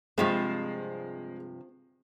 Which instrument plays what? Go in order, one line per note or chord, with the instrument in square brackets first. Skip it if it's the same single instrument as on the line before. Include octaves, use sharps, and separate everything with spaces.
[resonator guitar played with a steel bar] G2 C3 F3 [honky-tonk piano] G#3 [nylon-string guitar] C4 F4